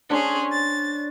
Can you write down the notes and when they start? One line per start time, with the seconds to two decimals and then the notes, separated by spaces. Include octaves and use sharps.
0.10 C#4 D4 G#4 C5 C#5
0.51 A6